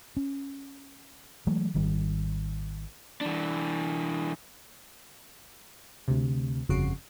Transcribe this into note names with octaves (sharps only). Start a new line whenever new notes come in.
C#4
E3 F#3 G#3 A3
G#1 D#3 G3
E3 D4
D2 C3
G1 F2 C#3 F#4 C7 D7